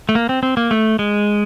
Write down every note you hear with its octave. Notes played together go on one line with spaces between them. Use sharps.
A3
A#3
C4
C4
A#3
A3
G#3